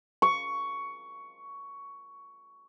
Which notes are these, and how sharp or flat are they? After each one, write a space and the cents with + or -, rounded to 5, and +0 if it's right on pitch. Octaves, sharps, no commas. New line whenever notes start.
C#6 +10